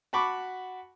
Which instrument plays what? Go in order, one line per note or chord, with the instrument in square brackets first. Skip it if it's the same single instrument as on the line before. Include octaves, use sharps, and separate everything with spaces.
[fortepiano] F#4 A5 B5 C#6 D6